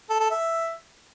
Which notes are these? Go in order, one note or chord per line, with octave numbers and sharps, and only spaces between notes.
A4
A4
E5